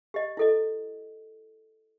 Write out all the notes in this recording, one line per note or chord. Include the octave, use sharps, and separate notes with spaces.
G4 D#5
E4 A4 D#5